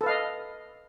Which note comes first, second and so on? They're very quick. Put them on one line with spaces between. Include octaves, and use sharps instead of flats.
A4 B4 F5 D#5